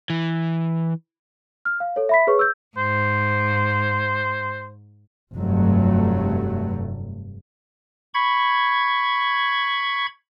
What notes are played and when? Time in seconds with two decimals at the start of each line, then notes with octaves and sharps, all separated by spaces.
0.10 E3
1.65 F6
1.80 F5
1.96 A4 C#5
2.09 E5 B5 B6
2.27 G#4 B4 C#5 C#6
2.39 E6 G6
2.77 G#2 C5
5.34 F1 G2 F#3 A3
8.14 B5 C#6 G#6